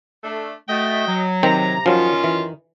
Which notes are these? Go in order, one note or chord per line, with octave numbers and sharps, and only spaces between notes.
A3 D4
A3 F#4 D#5 G5
F#3
C3 D#3 C4 G5 A#5
F#2 D#3 F3 F#3 C#4 F4
E3